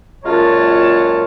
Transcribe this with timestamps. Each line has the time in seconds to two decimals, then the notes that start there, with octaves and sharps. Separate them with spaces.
0.24 F#2 A#2 G#3 F4 C#5 A5